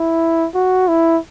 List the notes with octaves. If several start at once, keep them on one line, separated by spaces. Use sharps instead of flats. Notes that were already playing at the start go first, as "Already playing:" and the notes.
Already playing: E4
F#4
E4